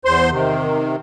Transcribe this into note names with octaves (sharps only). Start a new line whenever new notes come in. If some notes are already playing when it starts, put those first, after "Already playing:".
E2 C5 C6
C3 D#3